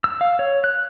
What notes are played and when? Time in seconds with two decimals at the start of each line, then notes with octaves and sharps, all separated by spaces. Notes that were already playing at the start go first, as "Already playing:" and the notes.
0.04 E6
0.21 F5
0.39 C#5
0.64 F#6